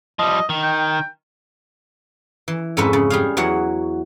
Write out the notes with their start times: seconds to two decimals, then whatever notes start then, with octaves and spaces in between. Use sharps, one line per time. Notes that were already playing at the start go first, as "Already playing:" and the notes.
0.19 F3 G3 D#5
0.49 D#3
0.63 G5
2.48 E3
2.77 F2 G#2 C#4 A4 B4 E5
2.93 C#3
3.10 G3 G#4 F5
3.37 E2 E3 F#3 F#4 F#5